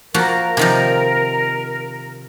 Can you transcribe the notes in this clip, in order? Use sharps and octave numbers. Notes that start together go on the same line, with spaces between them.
F3 A#3 F#4 A#4
C3 D#3 F3